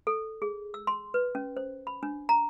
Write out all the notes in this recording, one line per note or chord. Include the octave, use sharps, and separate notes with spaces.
A4
G#4
E6
C6
B4
C#4
C5
B5
D4
A#5